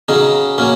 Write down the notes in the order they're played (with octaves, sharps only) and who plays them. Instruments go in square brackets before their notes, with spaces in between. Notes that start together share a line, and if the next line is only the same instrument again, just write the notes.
[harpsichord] C#3 F#3 C#4 D#4
F#3 A#3 C#4